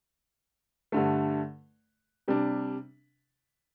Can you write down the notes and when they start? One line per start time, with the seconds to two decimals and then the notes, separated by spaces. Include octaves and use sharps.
0.92 G2 D3 A3
2.28 C3 G3 D4